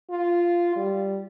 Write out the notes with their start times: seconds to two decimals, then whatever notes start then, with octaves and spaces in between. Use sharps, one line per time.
0.10 F4
0.76 G3